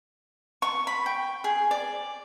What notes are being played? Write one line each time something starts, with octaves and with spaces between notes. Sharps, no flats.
C#6
B5
G5
G#4
D5